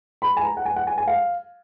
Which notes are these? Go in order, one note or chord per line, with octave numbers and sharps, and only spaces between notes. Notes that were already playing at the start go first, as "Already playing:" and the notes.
B5
G#5
A#5
F#5
G#5
F#5
G#5
G#5
F5